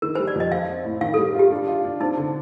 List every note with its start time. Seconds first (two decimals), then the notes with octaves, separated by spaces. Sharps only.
0.02 D#3 A#4
0.15 G3 C5
0.28 D5
0.36 F2 D#5
0.52 F3 F5
0.69 C4
0.85 A2
1.01 D#3 F5
1.14 G3 A4
1.35 F4 G4
1.51 D4
1.68 F4
1.84 D4
2.01 C4 D#4
2.17 D3